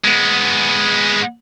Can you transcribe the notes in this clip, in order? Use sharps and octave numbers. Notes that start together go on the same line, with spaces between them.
G#3 B3